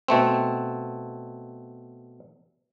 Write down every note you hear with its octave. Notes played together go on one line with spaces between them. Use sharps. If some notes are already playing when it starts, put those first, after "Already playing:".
B2 A3 C4